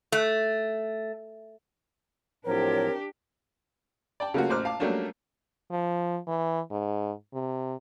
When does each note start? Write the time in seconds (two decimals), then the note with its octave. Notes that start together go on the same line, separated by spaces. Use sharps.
0.12 A3
2.46 A2 F3 F#3 C4 D4 G4 A#4 C#5
4.20 D5 G5 A5
4.34 C#3 F#3 A3 A#3 F4 F#4
4.50 A1 C5 D6 F6 F#6
4.65 F5 A5 D6
4.80 F#3 G3 A3 A#3 C#4 D4
5.71 F3
6.27 E3
6.71 G#2
7.33 C3